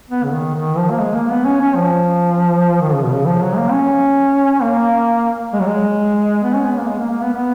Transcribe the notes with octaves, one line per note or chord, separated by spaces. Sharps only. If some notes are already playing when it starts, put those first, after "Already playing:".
B3
C#3
D#3
D#3
F3
A#3
G#3
A#3
B3
C#4
C#4
F3
D#3
C#3
B2
C#3
F3
F#3
A#3
C#4
A#3
G#3
F#3
G#3
B3
C#4
B3
A#3
G#3
A#3
A#3
B3
B3